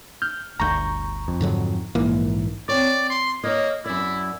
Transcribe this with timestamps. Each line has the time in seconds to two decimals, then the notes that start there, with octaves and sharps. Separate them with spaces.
0.22 F6 G6
0.60 G1 D2 A#5 C#6 G6
1.28 F2
1.41 G#2 D3 F#3
1.95 A#1 G#2 E3 A#3
2.69 C4 C#5 D5
3.10 C6
3.44 A#3 C#5 D#5
3.86 F#2 E4 D5